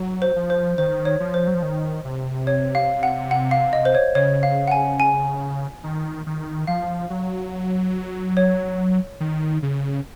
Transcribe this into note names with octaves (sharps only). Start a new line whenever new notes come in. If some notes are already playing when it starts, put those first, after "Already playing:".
Already playing: F#3
C5
F3
C5
D#3 C5
C#5
F3
C5
F#3
F3
D#3
C3
C#5
F5
F#5
F#5
F5
D#5
C5
C#5
C#3 C#5
F5
F#5
G#5
G#5
D#3
D#3
F3 F5
F#3
C#5
D#3
C#3